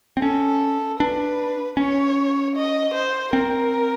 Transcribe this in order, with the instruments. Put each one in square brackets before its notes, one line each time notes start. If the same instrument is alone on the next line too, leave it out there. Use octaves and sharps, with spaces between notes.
[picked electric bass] C4
[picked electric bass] C#4 [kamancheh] A4
[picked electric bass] D4 [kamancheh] B4
[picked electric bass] C#4 [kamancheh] C#5
[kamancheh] D#5
C5
[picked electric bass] C4 [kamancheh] A#4